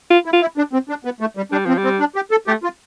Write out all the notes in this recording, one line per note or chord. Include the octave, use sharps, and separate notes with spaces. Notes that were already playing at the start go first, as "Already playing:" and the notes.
F4
E4
F4
E4
D4
C4
D4
B3
A3
G3
G3 D4
F3 C4
G3
C4
D4
G4
A4
A3 G4
F4